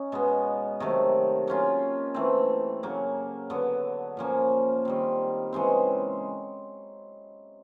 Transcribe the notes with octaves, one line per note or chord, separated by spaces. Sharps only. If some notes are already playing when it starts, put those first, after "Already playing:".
Already playing: C#4 D#4
B2 G#3 B3
C3 D#3 F#3 A3
F#3 A#3 C#4 F4
E3 A3 C4
C#3 F#3 A#3
D3 F#3 B3
A#2 F3 A#3 C#4
D#3 G3 C4
C#3 E3 G#3 C4